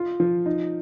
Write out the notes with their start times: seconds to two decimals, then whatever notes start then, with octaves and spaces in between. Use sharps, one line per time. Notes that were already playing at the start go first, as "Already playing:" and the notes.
Already playing: F4
0.20 F3
0.46 D#4